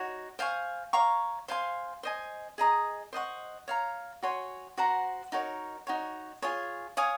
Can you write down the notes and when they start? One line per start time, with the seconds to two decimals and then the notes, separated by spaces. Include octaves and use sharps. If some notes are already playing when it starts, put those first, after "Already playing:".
Already playing: D#4 F#4 C#5
0.39 C5 F5 G#5 C#6
0.93 C#5 F5 A#5 C#6
1.48 C5 F5 G#5 C6
2.03 C5 D#5 G#5
2.58 G#4 D#5 A#5 D#6
3.13 C5 D#5 F#5 C#6
3.68 C#5 F5 A#5
4.22 F#4 C#5 G#5 C6
4.77 F#4 C5 F#5 A#5
5.32 D#4 F#4 A#4 C#5
5.87 D#4 F#4 C#5
6.42 F4 G#4 C#5 G#5
6.97 C#5 F5 G#5 D#6